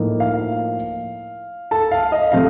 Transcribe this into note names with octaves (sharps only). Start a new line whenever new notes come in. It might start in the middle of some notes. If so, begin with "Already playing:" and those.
Already playing: A2 F3 A#3 D#4
F5
A4 A5
F5
D#5
C3 F3 A3 C4 F5